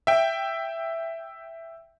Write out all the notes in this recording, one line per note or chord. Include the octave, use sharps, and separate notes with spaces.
E5 G5